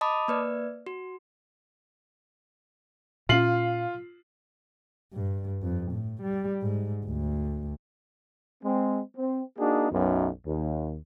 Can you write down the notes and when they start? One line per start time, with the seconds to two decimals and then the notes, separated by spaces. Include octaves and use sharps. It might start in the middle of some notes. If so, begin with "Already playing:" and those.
0.01 D#5 A5 B5 D6 D#6
0.28 A#3 B4 D5
0.86 F#4
3.29 A#2 C#4 F4 F5 C7 F#7
5.14 G2
5.63 F2
5.92 A2
6.22 G3
6.62 G#2
7.06 D2
8.64 G#3 C4
9.17 C4
9.58 A#3 D4 D#4 F#4 G#4
9.91 B1 F#2
10.46 D#2